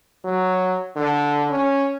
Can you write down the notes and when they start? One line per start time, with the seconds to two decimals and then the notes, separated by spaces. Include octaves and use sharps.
0.25 F#3
0.96 D3
1.50 C#4